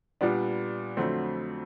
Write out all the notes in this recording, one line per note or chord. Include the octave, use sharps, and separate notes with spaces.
A#2 G3 B3 D4
F2 D3 F#3 A3 C4